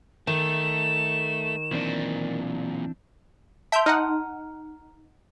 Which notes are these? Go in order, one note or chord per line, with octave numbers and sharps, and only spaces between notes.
D#3 A3 E7
B1 A#2 E3 C4 D4
E5 A5 C6 G6
D#4 F#5 A#5 F6